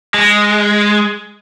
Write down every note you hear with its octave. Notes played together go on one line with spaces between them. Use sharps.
G#3